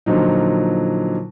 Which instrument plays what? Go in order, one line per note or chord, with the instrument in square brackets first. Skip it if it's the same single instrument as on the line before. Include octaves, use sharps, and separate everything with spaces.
[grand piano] A#2 D3 F3 F#3 D#4